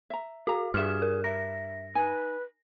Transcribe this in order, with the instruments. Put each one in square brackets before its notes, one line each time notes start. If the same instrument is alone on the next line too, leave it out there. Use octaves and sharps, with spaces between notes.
[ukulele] E5 A#5
[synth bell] F#4 [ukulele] G#4 A#5 [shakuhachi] F5
[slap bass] G2 [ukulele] F4 F#4 E5 [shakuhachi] G#4 [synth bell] F6 E7
[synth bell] A#4
[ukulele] D4 A#4 [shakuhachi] E5 [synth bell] A#6
[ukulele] D#4 G#5 [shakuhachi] B4